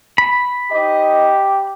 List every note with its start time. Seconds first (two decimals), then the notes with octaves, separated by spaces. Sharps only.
0.18 B5
0.71 D#4 G4 C5 D#5